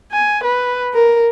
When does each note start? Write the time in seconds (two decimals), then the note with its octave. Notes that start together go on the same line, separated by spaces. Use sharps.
0.12 G#5
0.44 B4
0.94 A#4